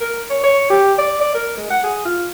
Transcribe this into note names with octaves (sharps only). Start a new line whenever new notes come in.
A#4
C#5
C#5
G4
D5
D5
A#4
G#3
F#5
G#4
F4